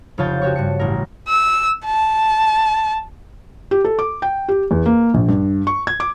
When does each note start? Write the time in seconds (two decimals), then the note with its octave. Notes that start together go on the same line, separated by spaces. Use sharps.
0.18 F1 C#3 F4 C#5 A5 G6
0.42 F#4 G4 C#5 C#6
0.56 G2 F#4 C#7
0.79 A1 A#4
1.28 E6
1.85 A5
3.71 G4
3.85 A4
3.99 D6
4.22 G5
4.48 G4
4.71 E2
4.86 A#3
5.14 A#1
5.28 G2
5.67 C#6
5.87 G#6
6.00 D6